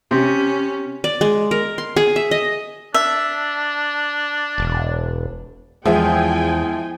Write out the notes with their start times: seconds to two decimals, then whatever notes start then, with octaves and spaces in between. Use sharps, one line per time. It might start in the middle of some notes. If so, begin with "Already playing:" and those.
0.11 C3 C#4
1.04 D5
1.21 G#3
1.51 A#4
1.78 C6
1.96 G#4
2.16 E5
2.31 D#5
2.94 D4 E5
4.58 E1
5.85 E2 F3 G#3 G#4 E5 G5 G#5